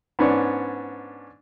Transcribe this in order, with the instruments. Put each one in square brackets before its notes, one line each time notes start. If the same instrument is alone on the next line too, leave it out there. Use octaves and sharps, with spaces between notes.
[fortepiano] G#2 B3 C#4 D4